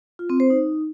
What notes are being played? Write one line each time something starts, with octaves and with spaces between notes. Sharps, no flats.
F4
C4
C5
D#4